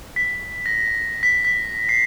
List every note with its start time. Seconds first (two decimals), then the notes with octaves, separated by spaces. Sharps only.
0.16 B6
0.66 A#6
1.23 B6
1.45 B6
1.89 C7